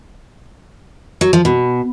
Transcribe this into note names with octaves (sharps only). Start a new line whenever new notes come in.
F#3
F3
B2